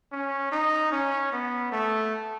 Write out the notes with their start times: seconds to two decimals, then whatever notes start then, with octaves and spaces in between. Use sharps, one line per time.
0.12 C#4
0.52 D#4
0.92 C#4
1.32 B3
1.72 A3